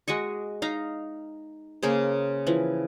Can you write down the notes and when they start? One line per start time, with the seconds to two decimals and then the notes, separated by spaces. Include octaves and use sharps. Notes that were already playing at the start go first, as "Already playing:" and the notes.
0.08 G#3 F#4 D#5 C#6
0.62 D#4 F5 A#5
1.83 C#3 A#3 G#4 C5
2.47 E3 F3